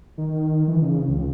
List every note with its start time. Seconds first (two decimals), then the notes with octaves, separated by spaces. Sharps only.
0.18 D#3
0.68 E3
0.82 C#3
1.08 C#2